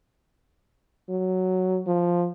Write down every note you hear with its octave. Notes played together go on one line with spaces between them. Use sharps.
F#3
F3